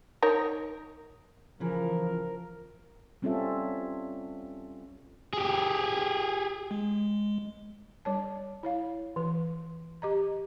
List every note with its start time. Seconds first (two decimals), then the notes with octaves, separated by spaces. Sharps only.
0.22 D#4 A#4 C#5
1.60 C#3 E3 F3 A#4
3.22 G3 C4 C#4 F4 A4 E5
5.33 G4 G#4
6.71 G#3
8.05 G3 C#5 A5
8.63 E4 C#5 F5
9.16 E3 B4
10.02 G4 D#5 A#5